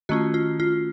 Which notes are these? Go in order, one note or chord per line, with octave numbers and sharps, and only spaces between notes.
D#3 A3 C#4 F4 F#4
F4
F4